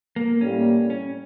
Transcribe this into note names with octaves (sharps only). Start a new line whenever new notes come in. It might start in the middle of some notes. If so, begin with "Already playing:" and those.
A#3
A2 G3 A#3 C#4
C#4